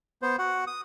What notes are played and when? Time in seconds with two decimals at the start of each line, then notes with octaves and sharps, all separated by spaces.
0.22 B3 C5
0.39 F#4 F#5
0.67 D#6